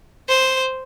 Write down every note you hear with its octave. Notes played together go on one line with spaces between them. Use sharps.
C5